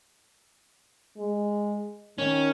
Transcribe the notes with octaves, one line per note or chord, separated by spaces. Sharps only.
G#3
D#3 C#4